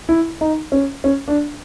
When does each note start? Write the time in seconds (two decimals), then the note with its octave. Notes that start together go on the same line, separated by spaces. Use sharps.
0.09 E4
0.41 D#4
0.72 C#4
1.04 C#4
1.28 D4